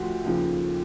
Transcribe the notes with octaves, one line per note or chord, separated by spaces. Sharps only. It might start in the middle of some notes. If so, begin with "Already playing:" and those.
Already playing: D2 F3 F#4 G4
D#2 C#3 F3